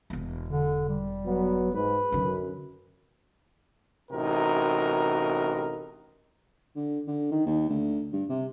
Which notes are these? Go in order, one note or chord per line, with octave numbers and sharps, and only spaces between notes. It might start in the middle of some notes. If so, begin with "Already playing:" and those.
E1 E2
D3
G3
F#3 B3
G#2 B4
F#2 D3 D#3
A1 C3 D#4 F#4 A#4
D3
D3
D#3
D#2
D2
G2
C3